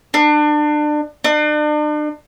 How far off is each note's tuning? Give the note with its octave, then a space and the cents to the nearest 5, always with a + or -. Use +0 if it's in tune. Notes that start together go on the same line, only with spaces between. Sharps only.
D4 +30
D4 +40